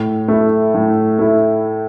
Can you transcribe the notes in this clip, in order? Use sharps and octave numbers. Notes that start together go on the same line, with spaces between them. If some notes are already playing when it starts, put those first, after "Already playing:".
Already playing: A2
A3 E4
A2
A3 E4